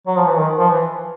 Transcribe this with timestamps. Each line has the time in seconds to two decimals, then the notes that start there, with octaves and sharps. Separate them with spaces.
0.07 F#3
0.16 F3
0.27 E3
0.37 D#3
0.58 F3
0.70 E3